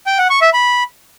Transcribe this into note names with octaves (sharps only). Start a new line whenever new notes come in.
G5
F#5
C#6
E5
B5